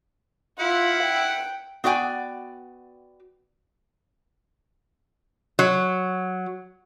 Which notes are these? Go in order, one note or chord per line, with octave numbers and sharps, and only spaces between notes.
E4 F4 F#5
G5
B3 F#4 D5 G5 G#5
F#3